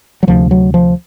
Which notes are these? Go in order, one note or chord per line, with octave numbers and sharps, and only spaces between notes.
F#3
D2 C3 F3
F#3
F3